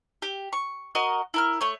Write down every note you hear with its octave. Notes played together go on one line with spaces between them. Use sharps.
G4
C#6
F#4 A#4 D#5
E4 A#4 F6
A3 C#5